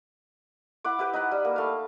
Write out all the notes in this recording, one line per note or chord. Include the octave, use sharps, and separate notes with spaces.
E4 F#5 D6
E4 G4 B4
D#4 E4 F#5
G3
A#3
A3 F5